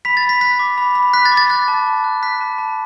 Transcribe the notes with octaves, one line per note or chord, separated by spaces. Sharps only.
B5 B6
A6
B5
B6
F#6 B6
D6
B5
B5
F#6 B6
A6
D6
A6
F#6 A6
A5
A5
F#6
F#6 B6
A5
A5